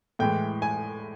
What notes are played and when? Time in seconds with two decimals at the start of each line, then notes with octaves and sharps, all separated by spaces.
0.19 A2 E3 G#3 G5
0.62 G#5